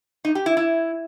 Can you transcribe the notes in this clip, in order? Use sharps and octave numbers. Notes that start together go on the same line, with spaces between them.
D#4
G4
E4
E4